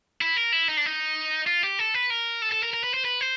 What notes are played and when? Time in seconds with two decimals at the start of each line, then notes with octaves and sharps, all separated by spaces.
0.21 E4
0.37 A#4
0.52 E4
0.68 D#4
0.77 D4
0.86 D#4
1.47 F4
1.63 G4
1.79 A4
1.94 B4
2.10 A#4
2.42 A4
2.52 A4
2.63 A#4
2.74 A#4
2.84 B4
2.94 C5
3.05 B4
3.21 C5